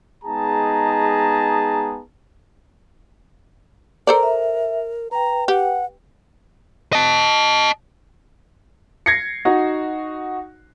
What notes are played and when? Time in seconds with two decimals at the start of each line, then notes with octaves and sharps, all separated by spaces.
0.24 G#3 B3 D#4 G#4 A5 A#5
4.07 A4 A#4 C5 D5 A#5
4.23 E5
5.11 B4 G5 A#5
5.48 G4 F#5
6.93 D#5 A5
9.06 G#6 A#6 C7 C#7
9.45 D#4 F#4